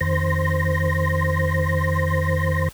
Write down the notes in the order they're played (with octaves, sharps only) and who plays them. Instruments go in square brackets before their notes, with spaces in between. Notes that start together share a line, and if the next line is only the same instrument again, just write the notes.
[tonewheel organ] F2 D#3 C5 C6 A#6